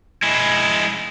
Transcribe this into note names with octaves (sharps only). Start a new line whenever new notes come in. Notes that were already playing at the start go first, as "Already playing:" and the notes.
G#3 E4